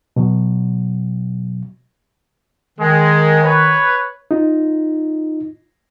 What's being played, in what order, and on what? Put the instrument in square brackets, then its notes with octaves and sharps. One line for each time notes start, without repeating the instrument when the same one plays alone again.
[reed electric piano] B2 F#3
[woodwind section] D#3 [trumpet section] G#3
[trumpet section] B4 C#5
[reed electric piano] D#4 F4